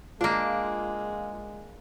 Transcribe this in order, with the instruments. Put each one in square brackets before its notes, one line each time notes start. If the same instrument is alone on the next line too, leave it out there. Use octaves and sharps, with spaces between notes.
[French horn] G#3 [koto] A#3 D4 [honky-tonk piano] F4